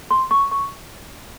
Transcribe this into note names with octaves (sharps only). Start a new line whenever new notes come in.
C6
C#6
C#6